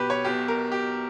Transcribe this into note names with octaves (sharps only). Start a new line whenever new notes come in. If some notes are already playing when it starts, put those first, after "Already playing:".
Already playing: B1 B2 G4 B4
C#5
B1 B2 G4
A#4
G4